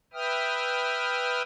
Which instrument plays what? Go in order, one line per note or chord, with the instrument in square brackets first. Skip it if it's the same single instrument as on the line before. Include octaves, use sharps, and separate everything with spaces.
[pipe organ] B4 E5 G5 D#6 F6